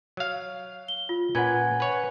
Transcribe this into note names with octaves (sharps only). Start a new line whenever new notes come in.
F#3 F5
G7
F4
A#2 C#4 B4 F#5 G#5 G#6
B4 C#5